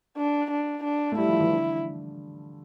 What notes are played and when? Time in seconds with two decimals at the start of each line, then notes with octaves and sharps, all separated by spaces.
0.17 D4
0.51 D4
0.84 D4
1.12 A3
1.18 G3 E4
1.29 F3
1.40 E3
1.51 D3